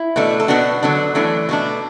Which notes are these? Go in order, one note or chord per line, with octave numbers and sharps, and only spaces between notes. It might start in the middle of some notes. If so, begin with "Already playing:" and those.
Already playing: E4
B2 A3 D4
A4
B2 B3 D4 F#4
D3 F#3 D4
E3 A3 D4
B2 A3 D4